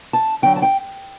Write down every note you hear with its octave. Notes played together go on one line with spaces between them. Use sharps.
A5
D2 D3 F#3 G5
A5
G5